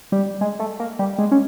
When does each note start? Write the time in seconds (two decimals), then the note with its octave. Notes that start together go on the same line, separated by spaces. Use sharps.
0.12 G3
0.41 G#3
0.60 A3
0.80 A#3
0.99 G3
1.18 G#3
1.31 C#4